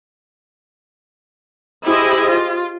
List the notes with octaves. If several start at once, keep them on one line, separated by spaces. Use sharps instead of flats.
E4 G4 G#4 C5 D#5
F4